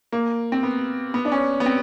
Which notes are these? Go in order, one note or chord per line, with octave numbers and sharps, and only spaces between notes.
A#3
C4
B3
B3
D4
C#4
B3
C4